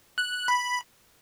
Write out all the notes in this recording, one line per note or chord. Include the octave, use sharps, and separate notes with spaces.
F#6
B5